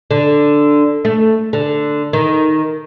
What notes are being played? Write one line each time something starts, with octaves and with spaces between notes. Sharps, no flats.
D3
A3
D3
D#3